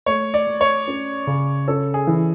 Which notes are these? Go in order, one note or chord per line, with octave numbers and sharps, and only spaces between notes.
A3 C#5
D5
A3
C#5
C#4
C#3
C#4 A4
G#4
E3